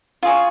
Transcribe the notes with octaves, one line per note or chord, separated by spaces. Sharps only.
F4 G#4 C#5